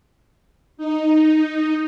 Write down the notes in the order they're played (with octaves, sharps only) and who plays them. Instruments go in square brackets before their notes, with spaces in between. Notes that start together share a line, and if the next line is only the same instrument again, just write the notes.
[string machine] D#4